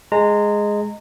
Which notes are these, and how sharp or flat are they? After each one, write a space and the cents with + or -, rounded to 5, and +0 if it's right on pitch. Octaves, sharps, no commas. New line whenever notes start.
G#3 +0 A#5 -25